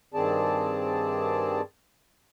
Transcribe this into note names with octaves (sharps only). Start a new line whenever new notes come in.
G2 D#3 C4 G#4 D5 A5